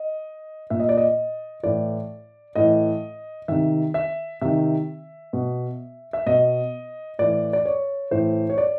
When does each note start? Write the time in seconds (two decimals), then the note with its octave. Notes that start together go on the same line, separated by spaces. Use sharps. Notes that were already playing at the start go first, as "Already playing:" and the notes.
Already playing: D#5
0.70 A#2 E5
0.80 D#5
0.89 D5
0.97 D#5
1.63 A2 E3 D5
2.55 A2 E3 D#5
3.48 C3 D#3 E5
3.94 E5
4.41 C3 D#3 E5
5.33 B2
6.13 E5
6.26 B2 D#5
7.19 A2 E3 D5
7.53 D5
7.65 C#5
8.11 A2 E3 C5
8.50 C#5
8.58 D5